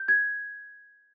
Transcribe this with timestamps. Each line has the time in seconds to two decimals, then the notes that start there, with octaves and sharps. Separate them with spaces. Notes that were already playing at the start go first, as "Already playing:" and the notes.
Already playing: G6
0.08 G#6